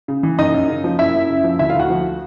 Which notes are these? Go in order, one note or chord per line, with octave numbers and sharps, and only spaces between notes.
C#3
E3
F#2 D#4 D#5
F#2
C#3
F3
F#2 E4 E5
F#2
C#3
F3
D2 E4 E5
F4 F5
D2 F#4 F#5
F3